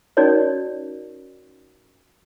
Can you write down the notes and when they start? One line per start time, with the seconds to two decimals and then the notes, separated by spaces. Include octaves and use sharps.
0.17 C#4 D#4 F#4 A#4 C#5 D5